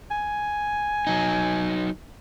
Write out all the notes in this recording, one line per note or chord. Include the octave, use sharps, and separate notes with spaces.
G#5
F#3 D#4